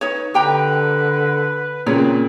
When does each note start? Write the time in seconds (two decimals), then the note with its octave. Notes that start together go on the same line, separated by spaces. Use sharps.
0.01 D#4 B4 C#5
0.34 D3 G4 B4 G5 A#5
1.87 A#2 C#3 C4 C#5